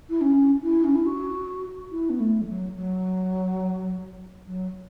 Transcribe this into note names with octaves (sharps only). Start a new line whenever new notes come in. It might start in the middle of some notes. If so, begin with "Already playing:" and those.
E4
C#4
E4
C#4
E4
F#4
E4
B3
A3
E3
F#3
F#3
F#3